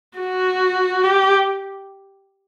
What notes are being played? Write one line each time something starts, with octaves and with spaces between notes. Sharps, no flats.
F#4
G4